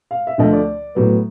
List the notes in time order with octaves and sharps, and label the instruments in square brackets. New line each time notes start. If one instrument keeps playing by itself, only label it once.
[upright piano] F5
E5
D2 D3 F3 A3 D#5
D5
A2 F#3 B3